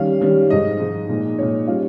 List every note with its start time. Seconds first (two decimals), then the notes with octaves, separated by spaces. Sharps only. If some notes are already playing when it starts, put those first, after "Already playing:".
Already playing: D#3 G3 C#4 F5
0.21 D#3 G3 C#4
0.50 G#2 F3 G#3 D#4 D#5
0.80 G#2 F3 G#3 D#4
1.09 A#2 G#3 D#4
1.38 A#2 G#3 D#4 C#5
1.68 G3 C#4 F4